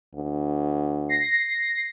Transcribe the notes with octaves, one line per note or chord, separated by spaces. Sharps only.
D2
A#6 C7